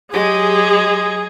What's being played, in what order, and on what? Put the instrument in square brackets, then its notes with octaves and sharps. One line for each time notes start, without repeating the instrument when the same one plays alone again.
[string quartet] F#3 G#3 [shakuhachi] G4 [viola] G#4